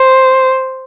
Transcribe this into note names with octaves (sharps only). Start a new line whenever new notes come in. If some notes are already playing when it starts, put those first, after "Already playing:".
Already playing: C5